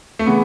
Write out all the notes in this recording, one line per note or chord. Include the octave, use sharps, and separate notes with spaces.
A3
C#3 E3 B3